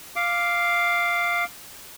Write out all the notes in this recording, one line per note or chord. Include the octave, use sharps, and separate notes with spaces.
F5 D6